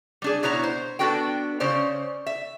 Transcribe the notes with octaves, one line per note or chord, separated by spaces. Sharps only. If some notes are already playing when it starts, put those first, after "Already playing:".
G3 D4 G#4
B2 B3 E4 C#5 A#5
C5
B3 D4 F#4 A4 G5
C#3 C#4 C5 D5
E5